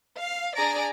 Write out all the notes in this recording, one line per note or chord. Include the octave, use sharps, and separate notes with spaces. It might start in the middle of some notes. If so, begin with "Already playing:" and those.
F5
D4 G#4 D5 A#5 A#6 D7